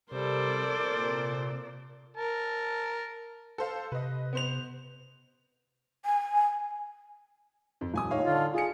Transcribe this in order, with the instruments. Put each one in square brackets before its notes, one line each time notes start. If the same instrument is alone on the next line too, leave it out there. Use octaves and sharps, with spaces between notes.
[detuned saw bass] C3 [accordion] G3 [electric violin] A4 C5 [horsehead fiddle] A#4 D5
[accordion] A#2
[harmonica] A#4 A5
[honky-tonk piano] A4 C5 F5
[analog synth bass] C3 [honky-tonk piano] B4 D#5
[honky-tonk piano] B3 C5 F7
[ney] G#5
[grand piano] F2
D#1 G#5 D#6
[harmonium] A2 [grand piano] D#4 C#5 F5
[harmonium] D3 F4
[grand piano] F4 C#7 [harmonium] G#4